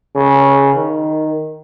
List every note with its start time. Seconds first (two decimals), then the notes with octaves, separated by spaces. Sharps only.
0.16 C#3
0.77 D#3